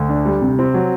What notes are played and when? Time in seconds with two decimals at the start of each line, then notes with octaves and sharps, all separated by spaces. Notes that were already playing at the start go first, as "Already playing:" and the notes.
Already playing: D2
0.09 D4
0.26 G3
0.42 C3
0.59 C4
0.74 F#3